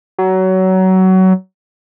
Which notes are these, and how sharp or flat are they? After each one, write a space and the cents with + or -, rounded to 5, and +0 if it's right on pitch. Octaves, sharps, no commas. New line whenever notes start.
F#3 +20